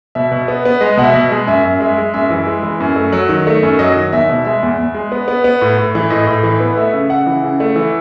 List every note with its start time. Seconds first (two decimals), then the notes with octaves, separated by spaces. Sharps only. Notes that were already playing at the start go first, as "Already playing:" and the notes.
0.15 B2 E5
0.32 B2
0.48 B3
0.65 B3
0.81 G#3 D#5
0.97 B2 F#5
1.03 E5
1.14 B2
1.31 G#3
1.47 F#2 E5
1.65 F#2
1.80 G#3 E5
1.98 G#3
2.14 F#2 E5
2.30 E3
2.47 G#3
2.63 E3
2.80 F#2
2.96 A3
3.12 F#3
3.29 D#3
3.47 A3
3.63 F#2
3.79 F#3 D#5
3.96 D#3
4.13 E2 E5
4.29 B2
4.45 G#3 E5
4.63 E2
4.79 E2
4.94 G#3
5.12 B3
5.28 B3
5.44 B3
5.61 A2
5.78 A2
5.95 E3
6.10 A2 D#5
6.27 A2
6.43 E3
6.60 B3
6.77 A3 E5
6.93 C#3
7.10 C#3 F#5
7.27 E3
7.44 C#3
7.60 A3
7.76 E3